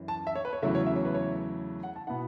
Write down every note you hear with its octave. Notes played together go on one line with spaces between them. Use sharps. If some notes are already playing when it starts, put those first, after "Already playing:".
Already playing: F#2 E3
A5
E5
C#5
B4
C#5
E2 C#3 F#3 A3 E4 E5
C#5
E5
C#5
B4
C#5
F#5
A5
B2 B3 E4 F#5